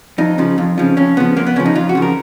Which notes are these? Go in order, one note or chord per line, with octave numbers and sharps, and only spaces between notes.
F2 D#4
C#3 F3
F2
C#3 F3
F2 C#4
C#3 F3 B3
F2 A#3
B3
C#3 F3 C#4
D#4
F2 F4
F#4
C#3 F3
A#4